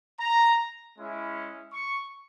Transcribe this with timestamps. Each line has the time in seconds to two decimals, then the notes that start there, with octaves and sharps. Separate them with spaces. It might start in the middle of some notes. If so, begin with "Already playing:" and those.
0.19 A#5
0.96 G#3 C#4 E4
1.73 C#6